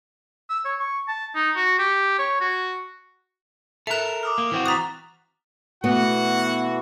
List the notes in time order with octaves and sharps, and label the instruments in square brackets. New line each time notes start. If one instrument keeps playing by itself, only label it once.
[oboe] E6
C#5
C#6
A5
D#4
F#4
G4
C#5
F#4
[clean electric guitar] A4 A#4 [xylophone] E5 F#6 [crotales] E7 F7
[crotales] D6 D#6 F6
[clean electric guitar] A#3
E3 C4 F#4
[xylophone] A#5 D#6 [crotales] F#6 A6 B6
[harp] B2 A3 [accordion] E3 F#4 [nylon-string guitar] B3 [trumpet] F#5